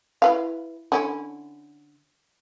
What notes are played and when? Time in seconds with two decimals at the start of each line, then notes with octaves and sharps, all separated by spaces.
0.22 E4 B4 F5
0.92 D3 C#4 E4